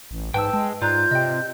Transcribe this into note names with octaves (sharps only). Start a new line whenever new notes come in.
A1
G#2 B4 G5 A5 E6
G#3 A5
G#2 F4 D5 A#5 F#6 G6
C3 D#5 G5